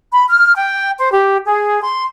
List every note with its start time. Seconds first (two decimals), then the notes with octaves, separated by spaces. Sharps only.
0.11 B5
0.28 F6
0.55 G5
0.98 C5
1.12 G4
1.45 G#4
1.82 C6